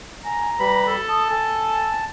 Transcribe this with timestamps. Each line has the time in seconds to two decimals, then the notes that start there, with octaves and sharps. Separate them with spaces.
0.25 G#5 A#5
0.59 G3 B4 B5
0.87 A4
1.09 A5 D#6
1.30 A4 G#5